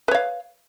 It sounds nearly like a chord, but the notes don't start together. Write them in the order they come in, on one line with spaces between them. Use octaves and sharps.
B4 C#5 F5